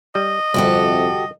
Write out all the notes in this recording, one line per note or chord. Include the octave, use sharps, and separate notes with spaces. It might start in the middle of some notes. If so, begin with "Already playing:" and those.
G3 D#5
G1 C2 F2 C3 F#4 G4 A4